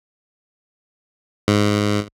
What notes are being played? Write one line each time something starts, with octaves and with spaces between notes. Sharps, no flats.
G#2